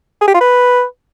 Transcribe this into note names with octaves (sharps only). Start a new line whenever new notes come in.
G#4
G4
F4
B4